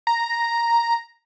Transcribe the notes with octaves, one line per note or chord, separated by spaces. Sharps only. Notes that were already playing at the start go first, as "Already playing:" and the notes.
A#5